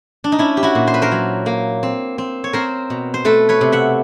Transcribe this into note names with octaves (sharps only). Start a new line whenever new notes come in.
D4
D#4
C#4 D4 E4
G4
E4 F#4
A#2
C5
B4
A#4 C5
F#3
A#3
C4
C4
C#5
C4 A#4 C5
B2
C5
A3 A4 B4
B4 C#5
C3
E5 F#5